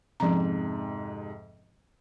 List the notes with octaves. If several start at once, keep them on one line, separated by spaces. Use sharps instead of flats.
F2 G#2 C3 F3 C#4 A#5